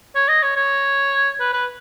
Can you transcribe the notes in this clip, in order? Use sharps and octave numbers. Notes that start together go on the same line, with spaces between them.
C#5
D#5
C#5
C#5
B4
B4